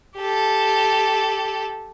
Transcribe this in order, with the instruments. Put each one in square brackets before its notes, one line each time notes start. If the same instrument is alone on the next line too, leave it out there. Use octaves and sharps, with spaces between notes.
[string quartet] G4 A4